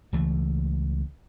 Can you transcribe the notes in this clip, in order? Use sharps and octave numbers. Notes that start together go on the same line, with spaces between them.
C#2 E3 A3